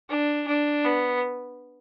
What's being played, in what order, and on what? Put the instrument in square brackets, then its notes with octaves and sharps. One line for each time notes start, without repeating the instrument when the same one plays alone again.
[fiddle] D4
D4
B3